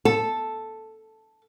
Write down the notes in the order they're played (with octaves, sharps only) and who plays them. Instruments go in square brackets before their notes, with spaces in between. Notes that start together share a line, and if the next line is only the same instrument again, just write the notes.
[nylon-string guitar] A4